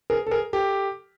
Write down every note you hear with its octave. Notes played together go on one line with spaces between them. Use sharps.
G#4 A#4
A4
G#4 A#4
G4 A4